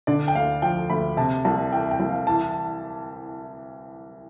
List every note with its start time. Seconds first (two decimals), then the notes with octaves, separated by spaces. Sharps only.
0.07 D3 D5
0.28 G5
0.35 D2 F5
0.62 F3 G5
0.90 D2 B5
1.17 C3 A5
1.45 C2 A5
1.72 E3 G5
1.91 G5
2.00 C2
2.09 F5
2.27 E3 A5